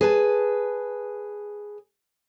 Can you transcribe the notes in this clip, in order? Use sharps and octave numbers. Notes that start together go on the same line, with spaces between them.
G#4 B4 A5